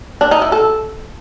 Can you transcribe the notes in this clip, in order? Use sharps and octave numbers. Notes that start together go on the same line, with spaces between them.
D4
D#4
E4
A4